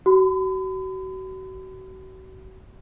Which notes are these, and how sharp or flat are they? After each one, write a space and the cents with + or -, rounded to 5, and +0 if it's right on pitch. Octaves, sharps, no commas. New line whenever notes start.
F#4 +35 B5 +40